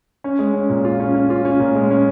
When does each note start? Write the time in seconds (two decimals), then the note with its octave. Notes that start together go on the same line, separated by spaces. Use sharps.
0.24 C#4
0.39 G#3
0.54 C#4
0.69 A#2
0.85 F4
1.00 C#4
1.14 C#4
1.30 F4
1.45 C#4
1.60 A#2
1.75 G#3
1.90 C#4